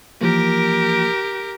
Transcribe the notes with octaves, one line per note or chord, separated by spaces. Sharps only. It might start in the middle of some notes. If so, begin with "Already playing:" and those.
E3 F3 A#3 G4 A#4